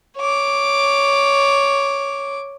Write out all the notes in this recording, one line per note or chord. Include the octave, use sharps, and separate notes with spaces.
C#5 D6